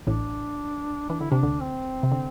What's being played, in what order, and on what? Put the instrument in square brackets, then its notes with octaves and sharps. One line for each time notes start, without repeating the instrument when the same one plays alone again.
[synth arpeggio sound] A1 A2 [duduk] D4
[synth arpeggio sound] E3 [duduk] D4
[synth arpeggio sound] D3 [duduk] E4
[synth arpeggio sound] C3 [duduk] D4
[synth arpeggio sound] D2 D3
[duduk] C4
[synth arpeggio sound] C3
D3